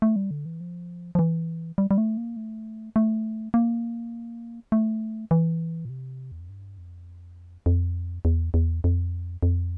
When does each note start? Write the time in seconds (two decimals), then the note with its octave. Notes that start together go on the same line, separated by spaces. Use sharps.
0.02 A3
0.16 G3
0.31 D3
0.46 E3
0.60 F3
1.15 F3
1.19 E3
1.78 G3
1.91 G3
1.98 A3
2.17 A#3
2.37 A3
2.96 A3
3.54 A#3
4.72 A3
5.31 E3
5.85 A#2
5.90 C3
6.32 E2
6.41 F2
6.49 G2
6.78 F2
7.66 F2
8.25 E2
8.54 E2
8.84 F2
9.43 F2